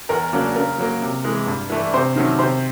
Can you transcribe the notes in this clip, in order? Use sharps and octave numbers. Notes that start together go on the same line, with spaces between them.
E2 A#4
C#3 F#3 A#3 D4
C#3 A#4
F#3 A#3
C3
E3 G#3
G2
E3 A3 D4
C3 C5
D#3 F#3 A3 C#4
C3 C5